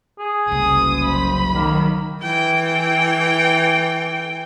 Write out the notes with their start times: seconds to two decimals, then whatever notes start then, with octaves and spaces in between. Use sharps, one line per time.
0.19 G#4
0.52 F#1 C2 D#6
1.06 C5 B5
1.55 D#3 F#3 A#3
2.22 E3 G5